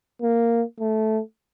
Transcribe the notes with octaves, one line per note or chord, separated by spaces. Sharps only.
A#3
A3